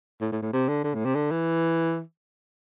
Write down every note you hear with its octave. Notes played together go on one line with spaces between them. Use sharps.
A2
A2
A2
C3
D3
D3
A2
C3
D3
E3